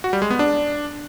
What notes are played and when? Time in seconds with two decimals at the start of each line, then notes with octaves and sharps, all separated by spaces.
0.04 F#4
0.13 G3
0.22 G#3
0.30 B3
0.39 D4